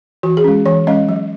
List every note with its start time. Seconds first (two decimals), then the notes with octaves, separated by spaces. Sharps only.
0.23 E3 F#4
0.37 G#4
0.44 G#3 C#4
0.66 E3 C#5
0.87 G#3 C#4 D#5
1.09 F#3